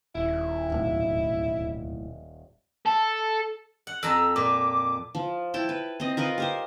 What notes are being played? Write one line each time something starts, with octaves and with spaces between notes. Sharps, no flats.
D#1 E4
D1 B1 A2
A4
F#5
F2 A5 A#5 E6
A#2 D6
F3
E4 G5 A5
B4
C4 D#5
F4 A#4 B4 D#5
G4 A#4 C5